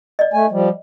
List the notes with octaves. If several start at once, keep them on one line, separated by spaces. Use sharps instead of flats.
D5 D#5
A3 G#5
F3 G3